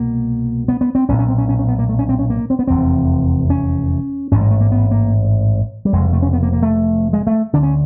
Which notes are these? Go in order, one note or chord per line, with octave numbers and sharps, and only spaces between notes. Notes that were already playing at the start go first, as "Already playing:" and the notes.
Already playing: C2 B2 A#3
B3
B3
C4
B1 A#2 C#4
C#4
C4
C#4
C#4
C#4
B3
A#3
A3
C#4
C4
C#4
A#3
C4
B3
F1 E2 C3 C4
C#4
A1 G#2 C#4
G#3
A3
A#3
B3
A#3
G3
F1 F2 C#3 G#3
A3
C#4
B3
A#3
A#3
A3
G#3
A3
D2 D3 D4
C#4